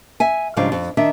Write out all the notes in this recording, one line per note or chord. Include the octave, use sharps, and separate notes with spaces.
E5 G#5
G#2 C#3 F3 G3 D4 F5
F2
D#3 D4 E5